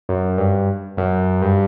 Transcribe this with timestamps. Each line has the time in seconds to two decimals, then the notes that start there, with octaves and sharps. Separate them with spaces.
0.09 F#2
0.38 G2
0.97 F#2
1.42 G2